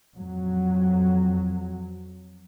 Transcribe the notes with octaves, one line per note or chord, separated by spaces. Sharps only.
F2 F#3